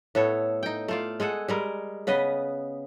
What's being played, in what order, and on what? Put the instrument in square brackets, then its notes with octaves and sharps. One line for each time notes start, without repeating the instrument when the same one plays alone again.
[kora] A2 B3 A4 C#5
D#4 G5
A3 F4 D5
G#3 G#4 A4 F#5
G3 G#3 A#4
C#3 B3 B4 D#5